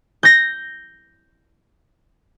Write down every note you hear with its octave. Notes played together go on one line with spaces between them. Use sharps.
G6 A#6